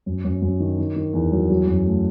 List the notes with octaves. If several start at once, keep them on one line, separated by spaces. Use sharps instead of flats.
F#2
F#2
F#2
D#3
D#3
D#3
E2
F#3
F#3
F#2
A3